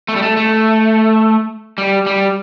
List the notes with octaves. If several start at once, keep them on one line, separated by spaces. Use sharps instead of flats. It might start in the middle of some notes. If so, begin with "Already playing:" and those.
A3
G3
A3
A3
G3
G3